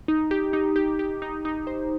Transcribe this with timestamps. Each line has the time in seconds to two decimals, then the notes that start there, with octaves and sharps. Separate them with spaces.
0.08 D#4
0.31 G4
0.53 D#4
0.76 G4
0.99 G4
1.22 D#4
1.45 D#4
1.67 C5